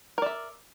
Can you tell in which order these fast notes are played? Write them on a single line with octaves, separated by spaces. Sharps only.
A#4 D5 E5